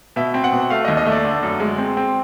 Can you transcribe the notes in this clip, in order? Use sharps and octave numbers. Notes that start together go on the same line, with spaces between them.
B2 E5
C4
F#5
B2
A3 F5
D#2 D#5
D#5
A3
D5
D3
F#2
G#3
C4
C4